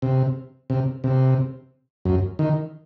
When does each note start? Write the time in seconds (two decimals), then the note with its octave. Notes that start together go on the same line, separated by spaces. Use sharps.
0.02 C3
0.70 C3
1.04 C3
2.05 F#2
2.39 D#3